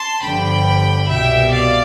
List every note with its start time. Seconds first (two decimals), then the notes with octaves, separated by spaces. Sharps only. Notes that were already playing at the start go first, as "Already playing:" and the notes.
Already playing: A5 C6
0.22 G1 G2 D3 F3 G5 B5
1.09 C2 B2 G3 E5 G5
1.52 D5 F5